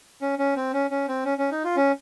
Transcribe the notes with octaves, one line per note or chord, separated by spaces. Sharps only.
C#4
C#4
C4
C#4
C#4
C4
C#4
C#4
D#4
F4
C#4